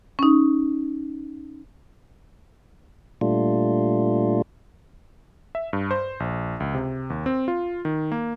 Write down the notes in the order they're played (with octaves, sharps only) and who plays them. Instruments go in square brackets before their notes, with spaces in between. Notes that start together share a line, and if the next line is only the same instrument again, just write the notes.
[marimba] C#4 D#4
[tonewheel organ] A#2 G3 A3 D4 F4
[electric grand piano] E5
G2
C5
A#1
C#2
C3
D#2
C4
F4
D#3
A#3